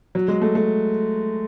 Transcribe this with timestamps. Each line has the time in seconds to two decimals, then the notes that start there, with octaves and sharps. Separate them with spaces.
0.15 F#3
0.28 G#3
0.42 A3
0.55 A3